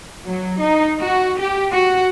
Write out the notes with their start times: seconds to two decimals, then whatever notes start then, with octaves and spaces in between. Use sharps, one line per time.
0.25 F#3
0.61 D#4
0.99 F#4
1.39 G4
1.71 F#4